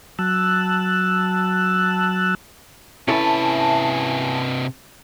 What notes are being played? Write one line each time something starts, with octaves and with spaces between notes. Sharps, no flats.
F#3 A5 E6 F#6
C3 C#4 E4 A4 B4 E5 G#5 A5